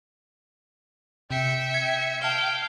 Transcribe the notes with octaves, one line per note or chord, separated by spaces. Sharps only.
C3 E5 G5 C#7
G#6
F5 G5 A5 F6 G7